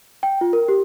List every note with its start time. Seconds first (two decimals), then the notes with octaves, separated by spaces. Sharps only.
0.23 G5
0.41 F4
0.53 A#4
0.68 G4